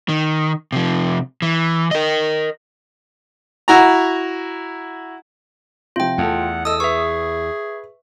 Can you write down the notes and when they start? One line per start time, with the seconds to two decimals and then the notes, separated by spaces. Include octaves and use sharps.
0.09 D#3
0.72 C3 F3
1.42 E3
1.91 A#4 D#5
3.68 E4 F#4 A#5
5.96 C3 F3 F4 G5
6.18 E2 A3 A4 F#5
6.65 A4 D#5 D#6 E6
6.80 G#4 B4 E5 C#6